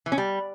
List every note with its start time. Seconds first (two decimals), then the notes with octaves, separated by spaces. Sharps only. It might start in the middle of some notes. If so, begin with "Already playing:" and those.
0.06 E3
0.12 C#4
0.18 G3